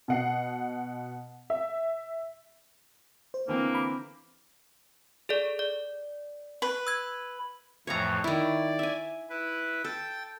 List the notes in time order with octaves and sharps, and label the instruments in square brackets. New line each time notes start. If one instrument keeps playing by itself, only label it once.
[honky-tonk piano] B2 F#5 C7
E5
[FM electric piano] C5
[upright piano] D3 E3 C4 [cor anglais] A#3
[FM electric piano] A#5 B5 D6
[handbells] G#4 A4 D5
D5
[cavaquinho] B4
[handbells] E6 G#6
[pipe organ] F2 A2 E3 [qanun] C#5 F5 A#5
[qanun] D#3 E4 [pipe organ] D5
[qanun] E5 G#5
[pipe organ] E4 B4
[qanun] A4 [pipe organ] G5 A6